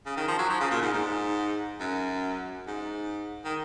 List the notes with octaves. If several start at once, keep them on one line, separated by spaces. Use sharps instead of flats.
C#3
D#3
F3
F#3
F3
C#3
A#2
G#2
G#2
F#2
G#2
D#3